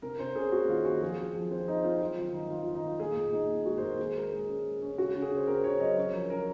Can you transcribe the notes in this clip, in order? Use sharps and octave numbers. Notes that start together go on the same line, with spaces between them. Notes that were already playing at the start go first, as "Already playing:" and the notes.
C3 A#4
C3 C5
C#4 G#4
A#3 F#4
D#3 F4
D#3 F#4
F3 G#4
C4
F3
C4 C5
C4 D#4
C4 F4
D#4
F#3 F4
D#3 F4
D#3 D#4
D#3 F4
D#3 F4
D#4
D#3 F4
A#2 G#4
A#2
A#2 D#4
C4 F4
G#3 F#4
C5
A#2 A#4
D#3 G#4
G#3 A#4
G#3 G#4
C#4
G#3
C#4
C#3 F#4
C#3
G#4
C#3
C5
C4 A#4
C#3 C#5
F#3 D#5
C#3 C#5
F3 A#4
C#3 A#4